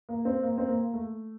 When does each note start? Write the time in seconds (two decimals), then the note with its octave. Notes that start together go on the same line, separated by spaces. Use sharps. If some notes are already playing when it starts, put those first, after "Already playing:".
0.09 A#3
0.25 C4
0.43 A#3
0.58 C4
0.68 A#3
0.94 A3